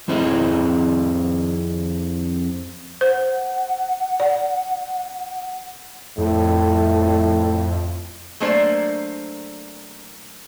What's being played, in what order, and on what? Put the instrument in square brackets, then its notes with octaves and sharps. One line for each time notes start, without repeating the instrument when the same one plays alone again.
[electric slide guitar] F2 C4 E4 G#4 D#5
[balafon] C5 [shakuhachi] F#5
[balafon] D5
[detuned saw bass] F2 [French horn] A2
[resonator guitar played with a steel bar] F#3 A3 A#3 D4 C5 D5